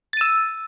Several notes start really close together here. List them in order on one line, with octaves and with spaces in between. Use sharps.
A6 D#7 E6